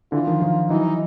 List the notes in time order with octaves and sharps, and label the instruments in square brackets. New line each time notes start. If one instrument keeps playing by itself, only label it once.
[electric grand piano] D3 E3 [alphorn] F4
[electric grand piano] D#3 F3
D#3 F3
[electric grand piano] E3 F#3 [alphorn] D#4